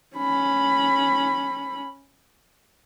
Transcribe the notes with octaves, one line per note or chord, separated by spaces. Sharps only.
C#4 B5